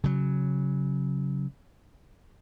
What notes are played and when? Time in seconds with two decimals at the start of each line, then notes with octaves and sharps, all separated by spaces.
0.04 C#3 F#3